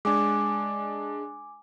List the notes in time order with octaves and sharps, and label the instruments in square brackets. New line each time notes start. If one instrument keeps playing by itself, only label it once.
[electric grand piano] G#3 D4 [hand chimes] G#5 D6